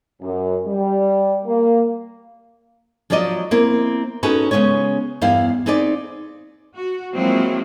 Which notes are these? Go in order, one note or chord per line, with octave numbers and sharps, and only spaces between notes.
F#2
G3
A#3
F3 F#3 D4 D5 D#5
A#3 C4 E4
C#4 D#4 F#4 G#4 A4 B4
C#3 G#3 B3 C#4 C#5
E2 G2 G3 E4 F5
C4 D#4 G#4 B4 D5
F#4
F3 F#3 G#3 A#3 C4 E4